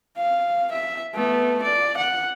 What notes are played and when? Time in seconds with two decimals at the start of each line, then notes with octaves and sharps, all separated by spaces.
0.17 F5
0.72 E5
1.15 A3 B3
1.63 D5
1.97 F#5